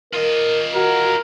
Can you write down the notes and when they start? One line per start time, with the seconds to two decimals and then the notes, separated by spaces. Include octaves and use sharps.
0.13 F4 A#4 D#5
0.75 F#4 A#4